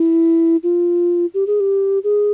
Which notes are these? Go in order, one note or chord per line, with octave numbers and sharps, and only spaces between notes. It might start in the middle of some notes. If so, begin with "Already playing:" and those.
Already playing: E4
F4
G4
G#4
G4
G#4